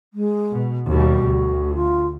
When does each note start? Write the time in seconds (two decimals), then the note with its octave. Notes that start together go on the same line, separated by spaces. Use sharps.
0.13 G#3
0.51 B2
0.88 D#2 B2 G3 F#4
1.25 D2
1.74 F4